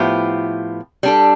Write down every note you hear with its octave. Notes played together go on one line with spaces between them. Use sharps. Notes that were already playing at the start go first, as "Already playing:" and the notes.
Already playing: A2 F3 B3 E4 G4
G3 D4 A4